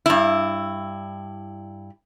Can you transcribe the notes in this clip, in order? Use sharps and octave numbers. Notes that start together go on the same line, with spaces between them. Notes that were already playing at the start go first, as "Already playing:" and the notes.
G2 E4